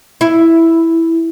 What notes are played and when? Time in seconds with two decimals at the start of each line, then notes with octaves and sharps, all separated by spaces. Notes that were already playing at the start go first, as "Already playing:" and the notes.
0.21 E4